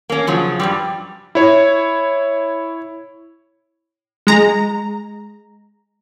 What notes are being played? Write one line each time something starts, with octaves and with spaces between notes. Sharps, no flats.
A#3 C#4
C#3 F3 F#3
G2 C3 G3
E4 C#5
G#3 A#5